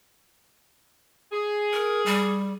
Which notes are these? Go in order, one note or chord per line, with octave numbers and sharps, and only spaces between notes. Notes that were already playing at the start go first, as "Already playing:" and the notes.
G#4
A#4
G3